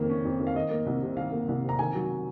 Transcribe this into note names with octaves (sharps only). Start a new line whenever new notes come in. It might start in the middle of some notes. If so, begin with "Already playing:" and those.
Already playing: F2 D#3 A#3
C#4
F2
D#3
F5
D#3 D#5
A#3
C2
C3
D#3 F5
A#3
C2
C3
A#5
D#3 G#5
F#3